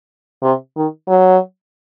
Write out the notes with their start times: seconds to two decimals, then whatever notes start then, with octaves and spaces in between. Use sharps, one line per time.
0.43 C3
0.76 D#3
1.08 F#3